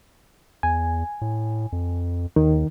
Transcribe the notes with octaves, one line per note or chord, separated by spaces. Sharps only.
E2 G#5
A2
F2
D#2 D#3